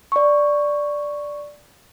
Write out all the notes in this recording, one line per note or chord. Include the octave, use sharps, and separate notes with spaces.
D5 C#6